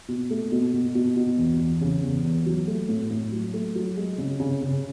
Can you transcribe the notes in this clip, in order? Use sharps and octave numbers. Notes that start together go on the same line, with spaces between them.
B2
A3
B2
B2
B2
B2
E2
E2
C#3
E2
E2
F#3
A3
A2
A2
F#3
A3
F#3
G#3
C#3
C#3
C#3